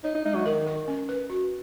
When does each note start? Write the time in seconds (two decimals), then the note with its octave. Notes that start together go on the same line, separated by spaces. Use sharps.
0.04 D#4 C#5
0.15 D#4
0.25 G#3 D#4
0.35 F#3
0.46 D#3 A#4
0.67 A#4
0.88 C#4
1.09 B4
1.30 F#4